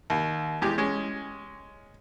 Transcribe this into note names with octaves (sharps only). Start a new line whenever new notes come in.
D#2
E2 G#3 G4
G#3 C#4